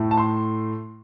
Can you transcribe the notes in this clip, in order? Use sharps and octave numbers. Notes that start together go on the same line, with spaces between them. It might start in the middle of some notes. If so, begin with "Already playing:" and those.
Already playing: A2 A3
A5
C6